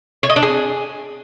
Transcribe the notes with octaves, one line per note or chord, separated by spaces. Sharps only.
C#5
D#5
D4
G#4